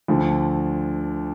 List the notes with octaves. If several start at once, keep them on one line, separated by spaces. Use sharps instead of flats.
D2 D3 F3